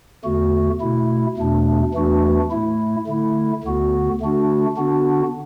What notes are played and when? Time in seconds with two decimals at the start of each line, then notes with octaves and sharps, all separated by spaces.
0.24 E2 D3 A3 F#4
0.81 B2 A3 E4
1.37 E2 B2 A3 D4
1.94 E2 E3 A3 D4 F#4
2.50 A2 A3 E4
3.07 D3 A3 E4
3.63 D2 D3 B3 F#4
4.21 D3 A3 D4 F#4
4.77 D3 B3 D4 F#4